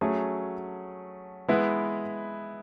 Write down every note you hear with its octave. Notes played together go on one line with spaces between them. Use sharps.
F#3 A3 C#4 G#4
G#3 B3 E4 B4